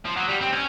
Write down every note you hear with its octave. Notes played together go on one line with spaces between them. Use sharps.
F3
F#3
G3
C4
C#4